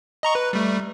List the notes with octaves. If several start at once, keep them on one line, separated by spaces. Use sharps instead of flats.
D#5 A#5 C#6
B4
G3 A3